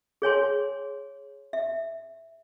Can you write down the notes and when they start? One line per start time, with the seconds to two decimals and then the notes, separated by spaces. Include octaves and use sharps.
0.22 G#4 C#5 G#5 C6
1.53 E5